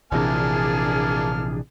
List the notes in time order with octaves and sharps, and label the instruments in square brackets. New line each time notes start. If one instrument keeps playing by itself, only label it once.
[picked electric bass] A#1 C3 E3 [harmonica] A#3 A5 F6 [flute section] D4 G#4